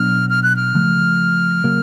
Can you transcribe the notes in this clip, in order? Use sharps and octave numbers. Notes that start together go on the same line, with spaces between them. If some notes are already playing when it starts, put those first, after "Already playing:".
Already playing: B2 F#3 B3 D4 F6
F6
F#6
F6
C#3 F3 A3
C#3 F#3 A#3